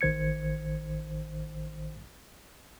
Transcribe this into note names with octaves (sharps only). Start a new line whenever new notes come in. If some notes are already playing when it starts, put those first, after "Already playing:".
A1 D#3 C5 G#6 C#7